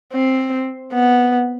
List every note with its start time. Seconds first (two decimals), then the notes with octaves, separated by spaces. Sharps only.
0.13 C4
0.93 B3